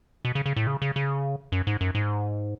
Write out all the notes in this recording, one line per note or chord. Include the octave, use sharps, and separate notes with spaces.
B2
C#3
C#3
A2
C#3
C#3
C#3
F#2
G#2
F#2
G#2